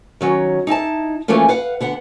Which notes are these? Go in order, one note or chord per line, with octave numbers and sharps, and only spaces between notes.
D#3 F#3 C#4
D#4 E4 G#5 A5
E3 F3 A3 A#3 C#4 F4
B4 F5 F#5
D3 B3 F#5